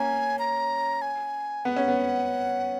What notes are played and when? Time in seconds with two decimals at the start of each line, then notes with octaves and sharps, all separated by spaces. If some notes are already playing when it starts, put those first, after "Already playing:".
Already playing: A#3 C#4 G#5
0.39 A#5
1.02 G#5
1.65 B3 F#5
1.76 C#4
1.88 B3